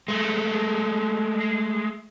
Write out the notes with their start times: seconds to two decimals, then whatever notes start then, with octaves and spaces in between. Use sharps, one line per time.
0.08 G#3 A3